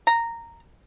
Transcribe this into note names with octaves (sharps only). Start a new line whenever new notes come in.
A#5